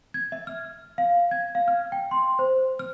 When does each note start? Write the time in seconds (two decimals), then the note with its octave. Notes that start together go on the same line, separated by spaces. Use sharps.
0.14 G#6
0.32 E5
0.47 F6
0.98 F5
1.31 G#6
1.55 F5
1.68 F6
1.92 G5
2.11 C6
2.39 C5
2.79 F6